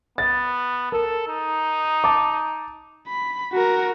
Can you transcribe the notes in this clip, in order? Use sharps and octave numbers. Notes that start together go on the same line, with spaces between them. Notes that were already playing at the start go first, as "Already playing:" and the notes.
B3 A6
A4 A#4
D#4
A5 D6
B5
F#4 A#4